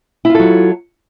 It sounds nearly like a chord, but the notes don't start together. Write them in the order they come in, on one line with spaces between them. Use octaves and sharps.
E4 F4 A4 F#3